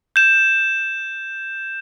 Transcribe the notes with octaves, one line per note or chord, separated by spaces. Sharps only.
G6 E7